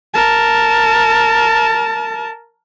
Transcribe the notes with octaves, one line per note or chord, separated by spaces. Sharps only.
A#4 A5